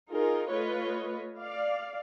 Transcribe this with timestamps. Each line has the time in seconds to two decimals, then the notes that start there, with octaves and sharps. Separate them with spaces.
0.10 D#4 F4 G#4 A#4
0.50 A3 F4 B4 C#5 D#5
1.40 D5 F5